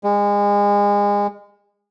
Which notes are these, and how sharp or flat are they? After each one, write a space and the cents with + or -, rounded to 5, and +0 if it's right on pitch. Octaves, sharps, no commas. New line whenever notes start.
G#3 -30